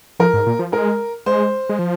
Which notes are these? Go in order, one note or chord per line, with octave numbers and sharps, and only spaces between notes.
F3 A#4
G#2
A#2
F3
G#3 A#4
G#3 C5
G#3
F3